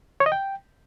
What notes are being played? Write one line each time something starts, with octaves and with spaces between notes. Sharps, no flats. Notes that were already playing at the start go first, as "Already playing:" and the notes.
C#5
D#5
G5